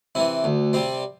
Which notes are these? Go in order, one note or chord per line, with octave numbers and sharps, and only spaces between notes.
C3 E3 E4
D2
C3 G3 C4